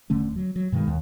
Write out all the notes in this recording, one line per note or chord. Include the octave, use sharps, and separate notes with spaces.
E1 D3 A3 C#4
F#3
F#3
G2 B2 D#3 G#3
D#2